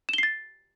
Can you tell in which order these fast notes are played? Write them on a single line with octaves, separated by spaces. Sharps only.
E7 G7 C7 A6